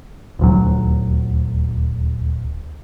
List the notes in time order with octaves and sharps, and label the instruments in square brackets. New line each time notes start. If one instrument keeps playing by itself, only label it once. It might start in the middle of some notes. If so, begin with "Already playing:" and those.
[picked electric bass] D#1 D2 F#3